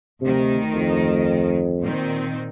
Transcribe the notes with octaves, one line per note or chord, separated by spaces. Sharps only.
D2 C3 D#3
F2
A#2 D#3 C4